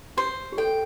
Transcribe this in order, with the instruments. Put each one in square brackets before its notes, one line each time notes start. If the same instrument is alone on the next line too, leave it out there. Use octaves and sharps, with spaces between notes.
[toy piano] G4 [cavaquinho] C5
[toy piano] G4
[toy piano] A4 [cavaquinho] G5